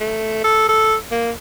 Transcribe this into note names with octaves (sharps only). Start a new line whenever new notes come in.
A3
A4
A4
A#3